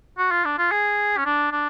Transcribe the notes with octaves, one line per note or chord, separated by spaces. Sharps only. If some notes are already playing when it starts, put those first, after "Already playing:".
F#4
F4
D4
F4
G#4
C#4
D4
D4